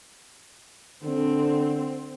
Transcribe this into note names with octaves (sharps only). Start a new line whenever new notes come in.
D3 C4